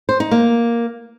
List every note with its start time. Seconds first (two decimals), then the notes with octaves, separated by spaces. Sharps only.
0.09 C5
0.20 D#4
0.31 A#3